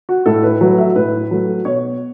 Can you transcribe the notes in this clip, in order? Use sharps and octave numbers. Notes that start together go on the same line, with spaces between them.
F#4
A2 A4
B4
F#3 A3 B4
E5
A2 B4
F#3 A3
B2 C#5